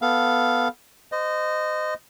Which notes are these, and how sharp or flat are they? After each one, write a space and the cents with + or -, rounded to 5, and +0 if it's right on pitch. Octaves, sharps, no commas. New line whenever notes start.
B3 +0 A4 +0 F5 +0
C5 -35 D#5 -15